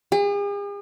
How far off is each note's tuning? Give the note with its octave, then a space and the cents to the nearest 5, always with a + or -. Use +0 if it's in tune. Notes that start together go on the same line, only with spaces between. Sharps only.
G#4 -45